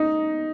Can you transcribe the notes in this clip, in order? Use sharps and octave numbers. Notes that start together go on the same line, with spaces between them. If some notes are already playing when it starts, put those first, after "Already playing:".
Already playing: D#4